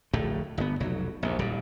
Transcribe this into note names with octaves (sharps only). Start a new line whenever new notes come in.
D1 A#1 A2 A3
G1 B3
F1 B1 F#3
A#1 D#2
D#1 A#2 G3